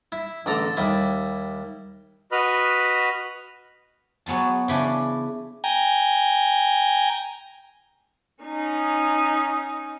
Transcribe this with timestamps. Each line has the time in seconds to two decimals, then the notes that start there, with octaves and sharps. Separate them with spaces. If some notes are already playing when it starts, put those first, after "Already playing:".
0.12 E4
0.46 A1 D3 A4 A#5
0.77 D#2 G3 E4
2.32 F#4 B4 D#5 B5 F6
4.26 F#3 B3 G#4 A5
4.68 C#3 E3 D4
5.64 G5 G#5 A#5
8.44 C#4 D#4